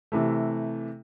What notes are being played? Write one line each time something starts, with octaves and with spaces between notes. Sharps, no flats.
C3 E3 A3